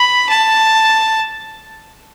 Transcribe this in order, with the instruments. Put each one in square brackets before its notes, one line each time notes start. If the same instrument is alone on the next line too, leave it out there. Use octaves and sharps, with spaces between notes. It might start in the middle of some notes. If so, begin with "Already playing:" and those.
Already playing: [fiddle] B5
A5